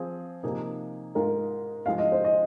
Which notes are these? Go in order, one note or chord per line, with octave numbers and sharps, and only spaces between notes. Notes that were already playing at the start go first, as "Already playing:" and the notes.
Already playing: F3 C4 G#4
C3 F3 A#3 D#4 G#4
G#2 G#3 F4 A#4
G#2 F3 G#3 F4 F5
D#5
C5
D#5